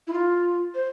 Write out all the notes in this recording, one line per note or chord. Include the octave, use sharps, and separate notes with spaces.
E4
F4
C5